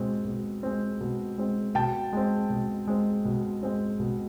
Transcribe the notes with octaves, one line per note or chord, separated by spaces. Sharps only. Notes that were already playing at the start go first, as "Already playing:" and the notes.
Already playing: B2 G#3 C4
B2
G#3 C4
B2
G#3 C4
B2 G5 A5
G#3 C4
B2
G#3 C4
B2
G#3 C4
B2